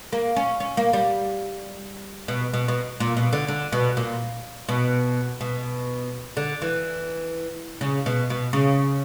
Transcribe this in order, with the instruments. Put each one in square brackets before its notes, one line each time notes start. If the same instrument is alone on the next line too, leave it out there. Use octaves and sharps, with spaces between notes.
[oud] A#3
C#4
C#4
A#3
G3
B2
B2
B2
A#2
B2
D3
D3
B2
A#2
B2
B2
D3
E3
C#3
B2
B2
C#3